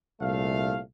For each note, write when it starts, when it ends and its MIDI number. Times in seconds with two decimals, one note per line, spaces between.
0.21 0.80 36
0.21 0.80 46
0.21 0.80 57
0.21 0.80 77